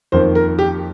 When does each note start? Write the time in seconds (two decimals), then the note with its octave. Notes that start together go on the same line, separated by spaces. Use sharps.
0.12 F2 D#3 A#3 C5
0.35 A#4
0.59 G4